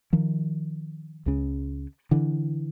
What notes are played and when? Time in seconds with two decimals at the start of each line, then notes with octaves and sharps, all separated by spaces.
0.13 D#3 F3
1.26 C#2 C#3
2.11 D3 E3